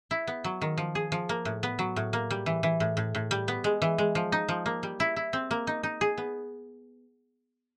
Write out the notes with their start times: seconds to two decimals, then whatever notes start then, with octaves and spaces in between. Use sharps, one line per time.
0.11 E4
0.27 B3
0.44 F#3
0.62 D#3
0.78 F3
0.95 G#4
1.12 F3
1.29 A#3
1.45 A2
1.63 B3
1.79 F#3
1.96 A2
2.13 A#3
2.31 G3
2.46 E3
2.63 E3
2.80 A2
2.97 A2
3.15 A2
3.31 G3
3.48 B3
3.64 G#3
3.82 E3
3.98 G#3
4.15 F3
4.32 D#4
4.49 F3
4.66 A#3
4.83 G3
5.00 E4
5.16 E4
5.33 C4
5.51 A#3
5.67 D#4
5.83 D#4
6.01 G#4
6.18 B3